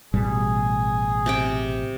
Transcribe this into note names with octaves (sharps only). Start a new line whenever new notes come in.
A1 B2 G3 G#4
C3 G4 G5